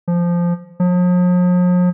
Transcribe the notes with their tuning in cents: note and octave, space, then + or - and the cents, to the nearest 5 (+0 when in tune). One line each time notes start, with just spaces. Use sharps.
F3 -10
F3 +45